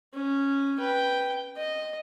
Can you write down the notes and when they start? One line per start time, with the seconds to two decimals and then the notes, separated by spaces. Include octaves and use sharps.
0.14 C#4
0.79 B4 G5
1.57 D#5